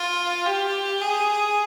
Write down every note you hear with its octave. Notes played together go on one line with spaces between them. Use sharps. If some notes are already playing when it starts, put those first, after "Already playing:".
Already playing: F4
G4
G#4